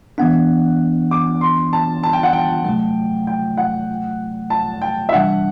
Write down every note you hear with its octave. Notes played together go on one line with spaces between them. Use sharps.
E3 B3 D4 F#5
D6
C6
A5
A5
G5
F#5
G5
C3 F#3 A3
G5
F#5
A5
G5
E5
C3 E3 G3 D4 F#5